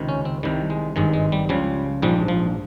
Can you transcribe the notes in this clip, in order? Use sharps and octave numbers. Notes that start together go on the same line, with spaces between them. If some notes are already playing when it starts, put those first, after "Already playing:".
Already playing: C#2 C3 D#3
C#4
C4
C2 C3 D#3 G3
G#3
G#1 G2 D#3 G#3
G#3
G3
C#2 C#3 F3 G3
A#1 G#2 F3 G3
F3